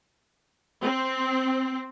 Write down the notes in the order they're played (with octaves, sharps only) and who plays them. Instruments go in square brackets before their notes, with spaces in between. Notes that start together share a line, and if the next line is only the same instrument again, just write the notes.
[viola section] C4